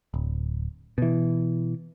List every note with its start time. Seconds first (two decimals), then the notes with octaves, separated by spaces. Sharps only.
0.14 D1
0.98 B2 E3